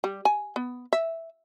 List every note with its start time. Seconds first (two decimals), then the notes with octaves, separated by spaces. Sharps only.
0.04 G3
0.25 G#5
0.56 B3
0.93 E5